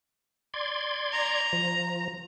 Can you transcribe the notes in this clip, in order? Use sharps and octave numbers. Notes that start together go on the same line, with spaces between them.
D5 C6 G#6
A#5
F3